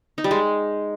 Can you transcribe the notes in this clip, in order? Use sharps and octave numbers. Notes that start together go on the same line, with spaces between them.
D#4
G3
G#3